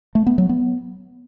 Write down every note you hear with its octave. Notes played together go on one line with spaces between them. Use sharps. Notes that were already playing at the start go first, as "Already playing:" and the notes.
A3
B3
F#3
B3